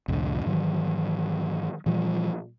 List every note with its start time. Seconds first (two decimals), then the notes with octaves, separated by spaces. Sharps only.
0.08 C2 F2 A2 D3
0.46 G#2 D#3 E3 F#3
1.86 A#2 E3 F3 G3